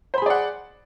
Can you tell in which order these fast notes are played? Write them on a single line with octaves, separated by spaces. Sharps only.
C5 B5 G#4 D5 F#5